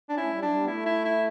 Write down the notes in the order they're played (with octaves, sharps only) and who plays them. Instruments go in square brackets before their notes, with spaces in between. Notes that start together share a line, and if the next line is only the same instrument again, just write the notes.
[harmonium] C#4 [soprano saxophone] D4
[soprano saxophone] E4
[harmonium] A3
G3
[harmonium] F#3 [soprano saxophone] D4
[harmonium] G3
B3
[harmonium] A3 [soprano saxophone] E4
[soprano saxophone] E4
E4